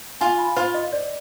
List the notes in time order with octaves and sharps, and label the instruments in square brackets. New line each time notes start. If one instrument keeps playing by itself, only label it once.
[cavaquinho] F4 [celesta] G#5
[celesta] B5
[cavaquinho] F4 [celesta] C5
[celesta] D#5
D5